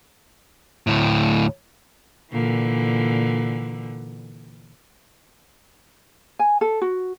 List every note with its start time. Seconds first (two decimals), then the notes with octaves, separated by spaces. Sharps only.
0.87 D2 A2
2.32 A#2 D3 E3
6.39 G#5
6.61 A4
6.81 F#4